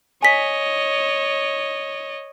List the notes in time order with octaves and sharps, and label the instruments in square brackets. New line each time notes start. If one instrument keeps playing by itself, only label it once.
[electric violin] C#5 D#5 [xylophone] G#5 B6